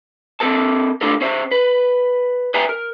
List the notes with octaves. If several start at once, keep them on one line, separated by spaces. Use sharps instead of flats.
C4 A4 A#4 A5
A3 D4 F4 A4 A#4
C#4 C5 E5
B4
B4 E5 G5 G#5 A#5
A#4